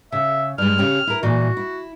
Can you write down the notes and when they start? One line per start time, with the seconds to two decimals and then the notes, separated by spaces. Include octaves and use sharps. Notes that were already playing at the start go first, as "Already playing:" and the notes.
0.12 C#3 E5
0.58 G2 G#3 F6
0.78 C#3 C#4 G4
1.07 E4 A#4
1.23 A#2 E3 F#4
1.57 E4